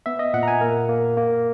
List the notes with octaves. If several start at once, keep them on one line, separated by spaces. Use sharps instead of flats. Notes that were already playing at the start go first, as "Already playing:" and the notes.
B3 E5
D#5
A#2 F#5
A#5
G#5
A#3 A#4
A#3
A#3